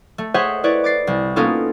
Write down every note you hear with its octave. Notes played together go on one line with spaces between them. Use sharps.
A3
G#4 C5 C#5 D#5 E5 F#5
E4 B4 C#5 D5
D6 A6 C7
C2
A#3 B3 C#4 D#4 F4 A4